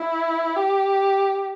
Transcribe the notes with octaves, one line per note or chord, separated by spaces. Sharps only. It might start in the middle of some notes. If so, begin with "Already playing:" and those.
Already playing: E4
G4